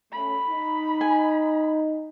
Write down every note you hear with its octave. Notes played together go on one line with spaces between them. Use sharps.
A3 C#4 B5
D#4
G#5